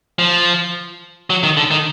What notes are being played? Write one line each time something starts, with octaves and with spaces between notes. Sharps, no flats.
F3
F#3
D#3
D3
D#3